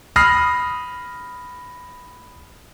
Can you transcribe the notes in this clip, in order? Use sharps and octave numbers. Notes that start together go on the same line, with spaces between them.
B5 D#6 F6 A#6 C7